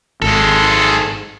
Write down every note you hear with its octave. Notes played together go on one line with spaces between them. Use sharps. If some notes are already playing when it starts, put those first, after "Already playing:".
G#1 G#3 A4